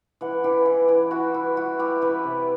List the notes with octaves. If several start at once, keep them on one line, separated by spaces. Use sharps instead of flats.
E3 F#5
E3 G4
E3
E3
E4 F#4
E3 E4
E4 F#4
E4 G4
E3 B4
C3